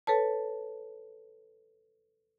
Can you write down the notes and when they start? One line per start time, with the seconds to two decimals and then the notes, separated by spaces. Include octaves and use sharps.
0.07 A4 B4 C#5 A5